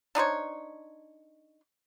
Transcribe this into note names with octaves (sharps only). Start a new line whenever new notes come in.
D4 D#4 C5 C#5